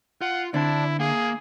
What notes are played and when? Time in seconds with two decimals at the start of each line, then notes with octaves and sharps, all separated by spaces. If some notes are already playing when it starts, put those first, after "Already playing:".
0.21 F4 F#5
0.54 D3 C4 E4 D5 A5
1.00 A#3 G#4